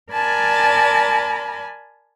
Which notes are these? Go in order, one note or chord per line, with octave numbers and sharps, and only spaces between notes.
A#4 D5 G#5 A5 B5